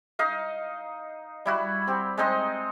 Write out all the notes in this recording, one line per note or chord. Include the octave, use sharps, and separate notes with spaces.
D#4 D#5 F5
G3 E4 F#4
C4 G4
G#3 C4 D#4 D#5